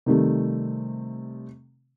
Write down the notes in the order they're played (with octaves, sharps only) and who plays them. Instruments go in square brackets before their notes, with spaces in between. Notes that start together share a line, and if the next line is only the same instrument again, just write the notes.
[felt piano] C3 D#3 G3 A3